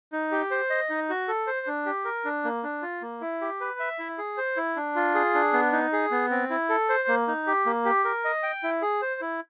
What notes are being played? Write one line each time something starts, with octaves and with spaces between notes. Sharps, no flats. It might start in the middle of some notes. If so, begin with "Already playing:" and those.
D#4
G4
C5
D#5
D#4
F#4
A4
C5
D4
G4
A#4
D4
A#3
D4
F4
A#3
E4
G4
B4
E5
E4
G#4
C5
E4
D4
F4
G#4
D4
B3
D#4
G#4
B3
C4
E4
A4
C5
A#3
D#4
G4
A#3
G4
A#4
D#5
G5
E4
G#4
C5
E4